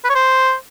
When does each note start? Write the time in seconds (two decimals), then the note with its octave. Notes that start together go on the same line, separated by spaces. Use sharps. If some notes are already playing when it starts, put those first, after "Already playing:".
0.04 B4
0.10 C#5
0.15 C5